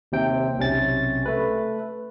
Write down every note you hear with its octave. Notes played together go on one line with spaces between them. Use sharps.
D#2 C3 G5
B1 C3 C#4 A6
A3 B4